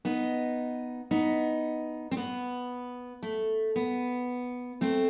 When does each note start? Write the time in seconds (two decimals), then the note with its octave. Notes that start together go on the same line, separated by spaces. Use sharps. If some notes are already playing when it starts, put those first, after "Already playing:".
0.05 B3 D#4
1.11 B3 D#4
2.11 C4
2.17 B3
3.23 A3
3.76 B3
4.81 A3 C4